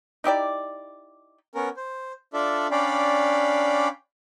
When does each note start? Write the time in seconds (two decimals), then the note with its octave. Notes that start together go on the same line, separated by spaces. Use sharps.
0.24 D#4 E4 G4 D5
1.54 B3 C#4 A#4
1.77 C5
2.33 D4 F4 A4 D5 E5
2.71 C#4 D4 D5 F5 G5 B5